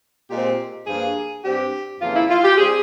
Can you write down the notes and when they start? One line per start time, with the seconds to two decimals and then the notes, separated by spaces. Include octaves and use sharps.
0.30 A#2 G#3 C4 G4
0.87 G2 F3 A#3 G#4
1.44 G2 G3 C4 G4
2.01 F2 C#3 E3 A#3 F4
2.16 E4
2.30 F4
2.44 G4
2.58 G3 C4 G#4